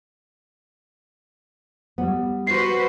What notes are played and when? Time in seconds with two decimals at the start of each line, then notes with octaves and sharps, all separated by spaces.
1.98 G3 B3
2.47 F#4 B4 C5 C7